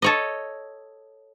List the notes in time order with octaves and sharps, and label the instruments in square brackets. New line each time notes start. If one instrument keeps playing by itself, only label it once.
[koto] A4 C#5 D#5